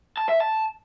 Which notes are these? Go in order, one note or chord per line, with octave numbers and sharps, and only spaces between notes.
A5
E5
A5